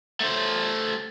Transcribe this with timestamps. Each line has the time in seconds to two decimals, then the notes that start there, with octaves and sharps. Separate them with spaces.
0.20 A3 C5